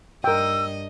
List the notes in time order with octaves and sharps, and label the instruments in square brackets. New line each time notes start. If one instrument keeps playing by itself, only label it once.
[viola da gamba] G2 D#5 [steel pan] A#4 G5 [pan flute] E6